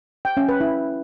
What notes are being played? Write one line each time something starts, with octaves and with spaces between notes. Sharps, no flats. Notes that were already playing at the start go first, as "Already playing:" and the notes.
G5
C#4
B4
E4